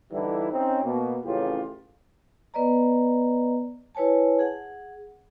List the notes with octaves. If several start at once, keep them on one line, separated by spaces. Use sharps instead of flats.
D3 E3 G3 D#4 E4
C4 C#4 D#4
B2 A#3
A1 F2 A2 C#3 F4 G4
B3 B4 D5 D#5 A#5
E4 B4 C#5 G#5 A5
G#4 F#5